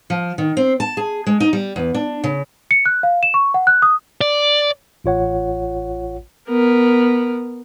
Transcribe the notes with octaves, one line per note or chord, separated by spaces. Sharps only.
F3
D#3
C4
A5
G#4
G#3
D#4
G3
E2
D4
C#3
C#7
F#6
F5
E7
C#6
F#5
F#6
D#6
D5
A1 F4 C#5 F#5
B3 A#4